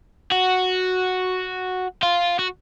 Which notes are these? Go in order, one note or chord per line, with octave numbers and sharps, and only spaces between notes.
F#4
F4
F#4